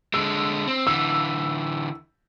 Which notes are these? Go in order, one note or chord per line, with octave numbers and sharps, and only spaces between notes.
D3 G#3 E6
C4
D3 E3 E6